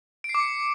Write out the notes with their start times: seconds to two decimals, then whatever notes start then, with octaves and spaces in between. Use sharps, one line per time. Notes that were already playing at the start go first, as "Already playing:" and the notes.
0.24 D7
0.29 C7
0.35 D6
0.40 C#7